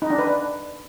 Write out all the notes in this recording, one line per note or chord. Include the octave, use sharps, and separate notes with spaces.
D#4
D4
B4
D4